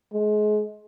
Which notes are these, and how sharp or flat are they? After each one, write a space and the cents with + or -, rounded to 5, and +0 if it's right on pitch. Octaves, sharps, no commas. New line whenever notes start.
G#3 +30